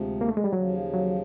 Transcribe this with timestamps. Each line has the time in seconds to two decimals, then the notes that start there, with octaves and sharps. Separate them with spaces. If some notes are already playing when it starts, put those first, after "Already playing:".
Already playing: D2 C3 F3 G#3
0.21 A#3
0.28 A3
0.37 G#3
0.44 G3
0.53 D#2 C#3 F3 F#3
0.94 F#3